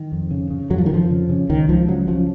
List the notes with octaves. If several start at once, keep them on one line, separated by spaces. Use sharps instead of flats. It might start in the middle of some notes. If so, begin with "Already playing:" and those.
Already playing: D#3
F2
C#3
C#3
F2 F#3
F3
D#3
F2 F3
C#3
C#3
C#2 D#3
C#2 F3
C#3 F#3
C#3 F3